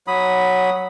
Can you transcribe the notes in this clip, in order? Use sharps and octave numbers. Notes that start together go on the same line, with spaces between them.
F#3 B5 D#6